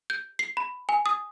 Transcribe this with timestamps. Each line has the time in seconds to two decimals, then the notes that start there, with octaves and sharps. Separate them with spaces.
0.10 G6
0.39 C7
0.57 B5
0.89 G#5
1.06 D#6